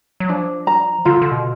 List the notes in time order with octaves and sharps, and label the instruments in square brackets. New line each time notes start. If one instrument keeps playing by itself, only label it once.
[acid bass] F#3
[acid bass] F3 [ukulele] D4
[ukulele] A#5
[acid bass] D3 [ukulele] F4
[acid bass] D3
B2